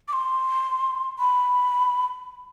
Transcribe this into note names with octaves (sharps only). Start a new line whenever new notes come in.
D6
C6
B5